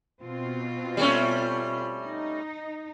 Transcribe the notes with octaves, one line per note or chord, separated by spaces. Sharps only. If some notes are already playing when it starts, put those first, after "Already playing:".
B2 C4 F4
G3 A3 C#4
D#4